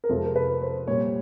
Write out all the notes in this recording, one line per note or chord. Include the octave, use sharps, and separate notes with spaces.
A#4
F2 C3 F3 G#3 A4
A#4
B4
C5
A#2 G3 C#5